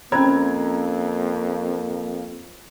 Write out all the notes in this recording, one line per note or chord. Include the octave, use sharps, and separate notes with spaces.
F2 A#3 C4 C#4 C5 A#5 B5 G#6